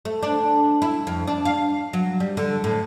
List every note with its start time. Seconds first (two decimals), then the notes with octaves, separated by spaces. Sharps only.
0.05 A3
0.23 D4
0.82 E4
1.07 F2
1.27 D4
1.45 F5
1.93 F#3
2.20 G3
2.37 D3
2.64 A2